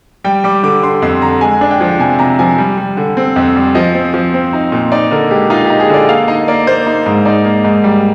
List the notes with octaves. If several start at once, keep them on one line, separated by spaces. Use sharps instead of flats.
G3 G5
G3 D6
D3 D6
D3 C6
F2 C6
D3 A#5
G#3 G#5
D4
G5
F3
C3 G#5
C3 A#5
F3 G#5
G3
G3
D3
C4
F2
G3
F3 D#5
C4
F3
C4
D#4
A#2
D#4 D5
D3 A#4
G#3 G4
D#4 F4
D#4 G4
G#4
D3 D5
A#3 F5
D#4 D#5
A#3 D5
A#3 C5
D#4
G#2
D#4 D5
A#3
G#2
G3